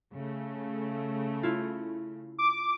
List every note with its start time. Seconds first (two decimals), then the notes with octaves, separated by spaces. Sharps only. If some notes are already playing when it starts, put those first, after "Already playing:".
0.14 C#3 A3
1.43 E4 F4
2.38 D6